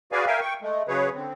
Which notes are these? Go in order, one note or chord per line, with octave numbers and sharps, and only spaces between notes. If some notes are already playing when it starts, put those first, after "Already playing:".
F#4 G#4 B4 D5 F5 G#5
A#4 E5 F5 G5 G#5
G5 C#6
G#3 A3
C#3 F#3 G#4 B4 C#5
D3 C4